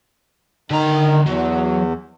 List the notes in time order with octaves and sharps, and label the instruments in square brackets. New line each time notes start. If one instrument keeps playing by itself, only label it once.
[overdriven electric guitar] D3 A#5 [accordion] D#3
[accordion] E2 [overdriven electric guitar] F#3